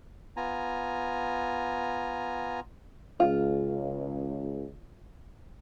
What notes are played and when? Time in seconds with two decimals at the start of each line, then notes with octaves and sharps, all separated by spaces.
0.37 B3 F4 G#5 A#5
3.20 C#2 F4